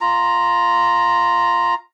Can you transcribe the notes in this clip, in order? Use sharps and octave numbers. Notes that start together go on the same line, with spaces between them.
F4 A#5